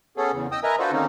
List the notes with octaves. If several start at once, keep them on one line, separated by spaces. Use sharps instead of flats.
B3 C#4 G#4 A4
E2 C#3
D#5 G5 D#6 E6
A#4 B4 D#5 E5 G#5 A#5
D4 F4 F#4 A4 B4 C5
D3 D#3 A#3 C4 C#4 D#4